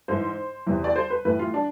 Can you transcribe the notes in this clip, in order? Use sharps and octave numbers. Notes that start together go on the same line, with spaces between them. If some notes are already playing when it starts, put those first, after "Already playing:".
G#2 E3 C5
E2 C3 E3
D5
C5
B4
A2 E3 B4
F4
D4